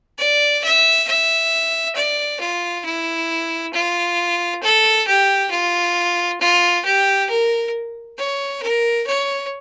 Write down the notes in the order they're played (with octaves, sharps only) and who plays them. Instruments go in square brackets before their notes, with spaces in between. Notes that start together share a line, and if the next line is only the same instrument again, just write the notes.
[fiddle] D5
E5
E5
D5
F4
E4
F4
A4
G4
F4
F4
G4
A#4
C#5
A#4
C#5